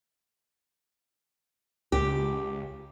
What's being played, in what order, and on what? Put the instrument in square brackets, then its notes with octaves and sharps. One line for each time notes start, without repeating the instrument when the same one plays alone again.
[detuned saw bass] C#2 [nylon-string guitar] G4